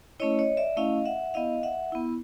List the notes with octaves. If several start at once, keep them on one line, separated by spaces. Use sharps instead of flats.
A3 C#4 E4 C#5 D#5
C#5 D#5
D5 E5
A3 C#4 E4 D#5 F5
E5 F#5
B3 E4 D#5 F5
E5 F#5
B3 E4